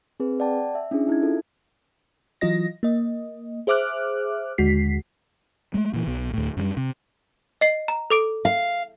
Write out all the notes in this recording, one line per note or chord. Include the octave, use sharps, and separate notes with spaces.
C4 G#4 B4
D5 F#5 G5 A5
E5
C#4 D4 E4 G#4
D#4 E4 E5 G#6
F4 A4
E3 F#3 F4 D#5 A#6
A#3 D#5
G#4 C5 E5 D6 F6 F#6
D#2 D3 G#3 F#4 B6 C7
G#3 A3
A#2 E3
B1 B2
D2 A2
F#2 D#3 G3
C3
D#5 C7
A#5
A4 D6 D7
F5